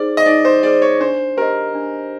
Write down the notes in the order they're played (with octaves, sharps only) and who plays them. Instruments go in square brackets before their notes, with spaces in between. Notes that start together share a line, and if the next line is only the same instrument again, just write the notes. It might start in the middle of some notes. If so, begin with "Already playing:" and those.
Already playing: [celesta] D#4 G#4 C5 [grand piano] D5
[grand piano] D#5
[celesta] D#4 [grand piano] D5
[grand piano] C5
[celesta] G#4 C5 [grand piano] D5
[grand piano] C#5
[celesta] D4 [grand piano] C5
[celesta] G4 C5 D#5 [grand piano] A#4
[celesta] D4